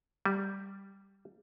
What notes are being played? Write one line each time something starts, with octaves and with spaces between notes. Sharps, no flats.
G3